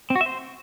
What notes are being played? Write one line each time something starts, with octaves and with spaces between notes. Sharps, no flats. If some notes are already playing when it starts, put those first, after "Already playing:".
C4
F#4
E5
C5